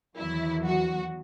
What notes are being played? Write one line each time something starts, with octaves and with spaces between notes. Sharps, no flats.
E2 D#3 F#3 E4
F#4